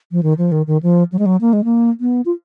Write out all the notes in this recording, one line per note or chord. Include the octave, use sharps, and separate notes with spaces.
F3
D#3
F3
D#3
D#3
F3
F#3
G#3
F#3
A#3
G#3
A#3
B3
F4